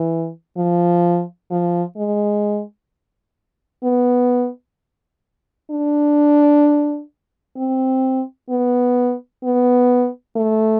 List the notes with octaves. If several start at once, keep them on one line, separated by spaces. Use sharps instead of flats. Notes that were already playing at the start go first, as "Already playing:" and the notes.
Already playing: E3
F3
F3
G#3
B3
D4
C4
B3
B3
A3